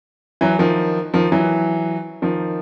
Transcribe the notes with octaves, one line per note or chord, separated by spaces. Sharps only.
E3 F#3
D#3 F3
D#3 F3
E3 F#3
D#3 F3